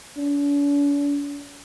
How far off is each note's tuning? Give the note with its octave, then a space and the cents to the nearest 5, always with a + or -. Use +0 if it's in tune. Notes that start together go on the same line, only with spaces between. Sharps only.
D4 -45